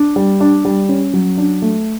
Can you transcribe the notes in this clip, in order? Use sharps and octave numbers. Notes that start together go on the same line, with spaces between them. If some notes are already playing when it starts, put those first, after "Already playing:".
Already playing: D4
G3
D4
G3
C#4
F#3
D4
A3